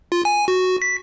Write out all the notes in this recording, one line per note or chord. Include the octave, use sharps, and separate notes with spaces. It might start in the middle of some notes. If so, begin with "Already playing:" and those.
F4
G#5
F#4
B6